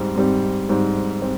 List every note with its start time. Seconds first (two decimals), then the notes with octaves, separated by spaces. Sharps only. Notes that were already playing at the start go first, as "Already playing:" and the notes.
Already playing: G#2 G3 C4
0.16 G#2 G3 C4
0.69 G#2 G3 C4
1.22 C4